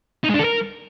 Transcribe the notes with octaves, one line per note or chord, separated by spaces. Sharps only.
D#4
G#3
D4
A4
A#4